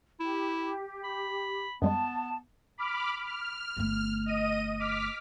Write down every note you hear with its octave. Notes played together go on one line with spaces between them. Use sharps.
E4 G4
B5
F#2 G3 G#3 B3 A5
B5 D6 F6
F6
G1 A3
D#5 D#7
D6 F6 B6